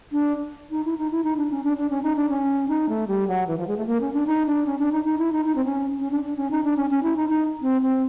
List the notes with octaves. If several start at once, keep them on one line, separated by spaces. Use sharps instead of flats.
D4
D#4
E4
D#4
E4
D#4
D4
C#4
D4
D4
C#4
D#4
D4
C#4
D#4
A3
G3
F#3
E3
F3
G#3
A3
A#3
C#4
D4
D#4
D4
C#4
D4
D#4
D#4
E4
D#4
D#4
C4
C#4
C#4
D4
D4
C#4
D#4
D4
C#4
C#4
E4
D#4
D#4
C4
C4